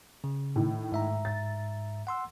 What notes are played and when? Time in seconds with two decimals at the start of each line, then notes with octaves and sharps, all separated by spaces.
0.24 C#3
0.56 A2 D#3
0.92 G#2 E5 A#5
1.25 A6
2.07 F#5 C6 E6